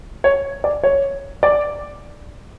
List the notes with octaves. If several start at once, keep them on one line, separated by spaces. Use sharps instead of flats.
C#5
D5
C#5
D5